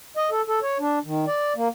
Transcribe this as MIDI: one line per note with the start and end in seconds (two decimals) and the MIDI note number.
0.17 0.30 75
0.31 0.41 69
0.48 0.59 69
0.62 0.78 73
0.80 0.99 62
1.05 1.25 51
1.27 1.53 74
1.56 1.68 58